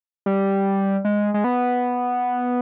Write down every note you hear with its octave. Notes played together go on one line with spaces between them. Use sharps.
G3
G#3
G#3
B3